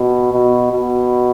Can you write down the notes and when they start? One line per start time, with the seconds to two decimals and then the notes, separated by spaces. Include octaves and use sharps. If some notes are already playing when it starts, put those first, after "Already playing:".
Already playing: B2
0.33 B2
0.72 B2